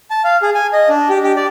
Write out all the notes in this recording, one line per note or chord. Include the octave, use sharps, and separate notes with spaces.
A5
F5
G#4
G#5
D#5
D4
G4
G4
D5